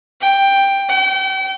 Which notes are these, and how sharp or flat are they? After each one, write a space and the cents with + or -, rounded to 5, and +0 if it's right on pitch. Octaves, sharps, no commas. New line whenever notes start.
G5 +10
G5 -40